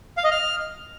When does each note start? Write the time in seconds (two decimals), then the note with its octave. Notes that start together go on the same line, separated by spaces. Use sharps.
0.17 F5
0.24 D#5
0.31 F6